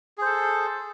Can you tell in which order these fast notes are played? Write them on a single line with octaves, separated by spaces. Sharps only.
G#4 C5 A4